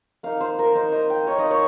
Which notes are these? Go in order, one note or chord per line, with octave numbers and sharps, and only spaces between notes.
A#3 D#4 F5
C5
A#4
A#3 D#4 C5
D#5
G5
A#3 D#4 C#5
D#5
C#5